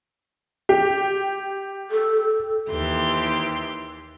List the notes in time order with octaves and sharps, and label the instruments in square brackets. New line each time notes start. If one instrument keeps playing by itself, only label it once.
[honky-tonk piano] G4
[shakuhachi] A4
[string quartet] D#2 E3 G4 C6